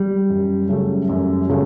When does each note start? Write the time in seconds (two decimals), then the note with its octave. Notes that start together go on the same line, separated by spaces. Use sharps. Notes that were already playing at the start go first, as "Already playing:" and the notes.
Already playing: G3
0.29 F#2
0.69 C#3 F#3 A3
1.09 F#2
1.49 C#3 F#3 A3